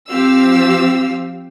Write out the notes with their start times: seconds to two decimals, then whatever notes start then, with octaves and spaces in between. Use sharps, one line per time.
0.11 F3 C4 G4 F5 E6